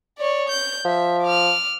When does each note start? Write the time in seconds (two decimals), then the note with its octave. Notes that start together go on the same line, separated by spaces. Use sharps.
0.19 C#5 D5
0.49 G6
0.85 F3 E5
1.22 D6 F6